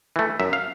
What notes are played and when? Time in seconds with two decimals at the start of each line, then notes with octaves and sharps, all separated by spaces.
0.16 E3 A3
0.40 F#2 E5
0.53 F5